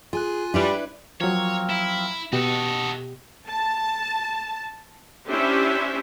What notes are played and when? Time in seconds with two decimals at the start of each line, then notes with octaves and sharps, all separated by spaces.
0.13 F4 G#4 G#5 F#6
0.54 G3 D4 E4 B4
1.21 F3 F#3 A#3 C4 A#4 C#5
1.70 E4
2.33 B2 F#4 G4 A4 D#5
3.48 A5
5.28 C#4 D4 E4 G4 C5 E5